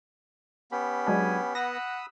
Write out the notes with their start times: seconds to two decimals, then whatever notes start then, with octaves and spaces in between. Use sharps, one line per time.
0.72 B3 C#4 G4 B5
1.07 F#3 G#3 D4 G#5
1.55 F#5 B5 D#6 E6 A#6